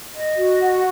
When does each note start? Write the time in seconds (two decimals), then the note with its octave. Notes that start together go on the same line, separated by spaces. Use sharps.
0.15 D#5
0.38 F#4
0.61 F#5